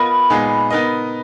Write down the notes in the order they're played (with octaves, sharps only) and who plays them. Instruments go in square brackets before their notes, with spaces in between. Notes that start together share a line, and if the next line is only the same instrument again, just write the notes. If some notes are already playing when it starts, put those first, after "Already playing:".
Already playing: [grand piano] B3 F4 A#4 D#5 [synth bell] B5
[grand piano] A#2 G#3 B3 D#4 G#4
B3 D#4 A#4 D#5